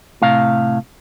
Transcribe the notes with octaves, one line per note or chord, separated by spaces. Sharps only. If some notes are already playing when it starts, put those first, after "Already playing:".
A2 C3 F5